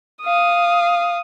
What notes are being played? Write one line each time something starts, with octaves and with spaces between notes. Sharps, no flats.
F5 D#6